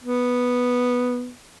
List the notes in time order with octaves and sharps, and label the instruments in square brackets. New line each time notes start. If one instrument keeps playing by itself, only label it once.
[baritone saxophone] B3